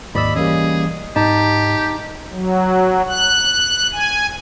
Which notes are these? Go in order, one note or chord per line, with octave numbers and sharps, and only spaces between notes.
D#2 G#2 D5 D#5 B5 E6
E3 G3 A#3 C#4 G#4
G#2 D#4 G4 A5
F#3
F#6
G#5